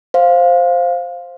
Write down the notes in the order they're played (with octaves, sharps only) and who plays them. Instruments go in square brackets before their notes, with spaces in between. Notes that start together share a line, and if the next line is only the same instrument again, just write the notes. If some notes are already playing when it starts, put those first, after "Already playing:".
[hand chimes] C5 F5